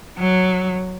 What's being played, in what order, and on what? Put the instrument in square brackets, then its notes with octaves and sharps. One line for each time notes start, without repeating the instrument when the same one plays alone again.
[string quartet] F#3